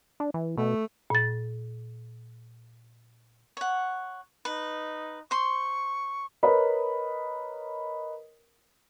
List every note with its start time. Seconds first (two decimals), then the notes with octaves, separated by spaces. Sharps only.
0.20 D4
0.34 E3
0.57 B2 A3
1.10 A#2 A6
3.57 C#5 F#5
4.45 D#4 B4
5.31 C5 C6 C#6
6.43 A#4 B4 C#5 D#5 B5